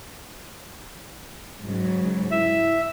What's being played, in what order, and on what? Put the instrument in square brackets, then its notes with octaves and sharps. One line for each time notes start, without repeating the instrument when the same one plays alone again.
[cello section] G#2 C#3 F#3
[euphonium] E4 [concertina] E5